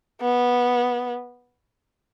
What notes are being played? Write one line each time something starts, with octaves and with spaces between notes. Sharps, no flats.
B3